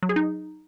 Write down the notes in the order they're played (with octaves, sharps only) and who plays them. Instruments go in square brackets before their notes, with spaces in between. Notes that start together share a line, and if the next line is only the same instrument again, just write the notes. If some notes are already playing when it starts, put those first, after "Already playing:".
[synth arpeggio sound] F#3
G#4
D#4